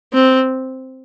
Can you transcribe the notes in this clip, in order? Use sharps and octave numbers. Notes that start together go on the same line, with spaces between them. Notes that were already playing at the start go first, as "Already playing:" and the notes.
C4